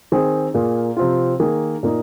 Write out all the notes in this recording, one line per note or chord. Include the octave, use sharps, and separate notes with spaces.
D#3 C4 G#4
A#2 A#3 G#4
C3 F3 C4 F4
D#3 A#3 G#4
A#2 A#3 D#4